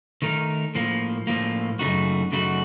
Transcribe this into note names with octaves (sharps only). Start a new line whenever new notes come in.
D#3 A3 D#4 A#4
A2 F3 A#3
A2 F3 A#3
F#2 C#3 A3 D#4 F#4
F#2 C#3 A3 D#4 F#4